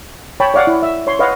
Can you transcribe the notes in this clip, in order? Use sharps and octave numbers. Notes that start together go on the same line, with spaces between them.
C#5 G5 A5 B5
C#5 D5 F5 F#5
E4
E5
C#5 C6
B4 C#5 D#5 F5 F#5